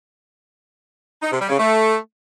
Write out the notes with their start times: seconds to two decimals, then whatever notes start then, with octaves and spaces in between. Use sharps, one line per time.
1.23 D#4
1.31 C3
1.40 G3
1.49 C#3
1.58 A3